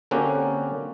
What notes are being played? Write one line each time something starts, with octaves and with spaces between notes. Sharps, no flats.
D3 A#3 C4 C#4 F#4 G4